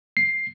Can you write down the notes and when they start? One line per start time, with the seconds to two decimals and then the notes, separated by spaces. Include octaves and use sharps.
0.17 C7